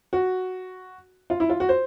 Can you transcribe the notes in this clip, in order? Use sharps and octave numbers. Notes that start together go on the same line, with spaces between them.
F#4
F4
E4
F4
F#4
C5